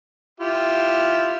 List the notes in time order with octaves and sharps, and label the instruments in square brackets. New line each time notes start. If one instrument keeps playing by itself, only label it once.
[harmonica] E4 F4 G4